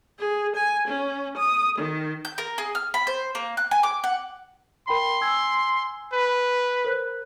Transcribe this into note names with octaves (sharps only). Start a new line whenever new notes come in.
G#4
G#5
C#4
D#6
D#3
G6
A#4
G#4
F6
B5
C5
A#3
F#6
G#5
D6
F#5
A#4 G5 B5 C6
G#5 E6 G#6
B4
A#4 C5 F#6